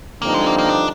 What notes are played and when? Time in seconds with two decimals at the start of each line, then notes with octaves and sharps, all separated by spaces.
0.22 G2 D3 F3 A#3 C4 D#4
0.34 G#3
0.46 A#3
0.58 A#3
0.69 D4